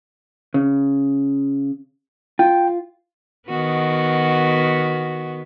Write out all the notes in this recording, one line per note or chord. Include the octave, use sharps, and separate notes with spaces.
C#3
F4 G5
D#3 B3 F#4